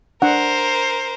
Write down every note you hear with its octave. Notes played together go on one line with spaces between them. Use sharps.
D4 A#4 C5 F#5